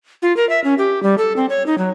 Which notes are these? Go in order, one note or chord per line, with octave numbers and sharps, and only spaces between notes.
F4
A#4
E5
C#4
G4
G3
A4
C4
C#5
D#4
F#3